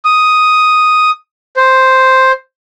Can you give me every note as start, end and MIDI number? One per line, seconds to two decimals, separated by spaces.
0.05 1.10 87
1.56 2.32 72